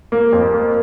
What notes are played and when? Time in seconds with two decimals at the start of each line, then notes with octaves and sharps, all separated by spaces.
0.12 A#3
0.33 F2
0.54 A#3